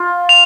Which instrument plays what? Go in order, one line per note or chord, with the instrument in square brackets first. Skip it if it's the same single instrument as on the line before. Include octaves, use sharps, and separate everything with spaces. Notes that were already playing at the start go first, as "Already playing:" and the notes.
Already playing: [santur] F4
[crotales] F7